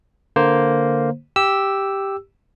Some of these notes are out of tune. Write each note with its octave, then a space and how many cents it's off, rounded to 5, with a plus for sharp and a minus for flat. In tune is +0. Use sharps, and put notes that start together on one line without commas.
D3 +0 A#3 +0 C5 +0
G4 +0 E6 +0